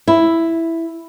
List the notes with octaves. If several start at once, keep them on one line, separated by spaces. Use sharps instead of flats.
E4